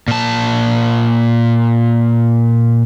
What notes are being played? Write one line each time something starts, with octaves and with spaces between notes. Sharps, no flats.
A#2 A5